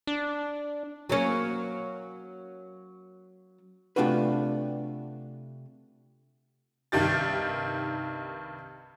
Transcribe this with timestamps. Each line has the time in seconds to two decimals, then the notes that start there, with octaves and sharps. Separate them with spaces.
0.07 D4
1.10 F#3 A#3 C#4
3.96 C3 A3 D4 F4 F#4 B4
6.92 C2 G2 D#3 G4 A6